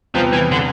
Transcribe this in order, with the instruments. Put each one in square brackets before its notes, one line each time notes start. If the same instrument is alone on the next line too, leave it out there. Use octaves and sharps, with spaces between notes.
[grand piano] E2 C3 G3 B3 [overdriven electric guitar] F3
[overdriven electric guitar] E3
D3